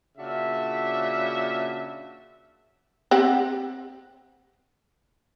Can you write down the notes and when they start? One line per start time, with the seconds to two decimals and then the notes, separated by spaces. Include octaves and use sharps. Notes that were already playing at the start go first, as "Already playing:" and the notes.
0.18 A#2 C#3 D4 F#4 E5
3.11 C4 G4 F#5